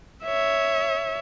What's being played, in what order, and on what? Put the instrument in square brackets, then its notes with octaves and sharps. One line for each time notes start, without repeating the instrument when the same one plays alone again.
[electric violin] C#5 E5